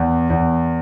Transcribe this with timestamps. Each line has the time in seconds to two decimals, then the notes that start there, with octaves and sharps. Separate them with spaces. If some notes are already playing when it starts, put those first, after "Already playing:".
Already playing: E2
0.30 E2